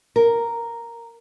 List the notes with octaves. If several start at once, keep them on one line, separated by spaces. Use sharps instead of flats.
A#4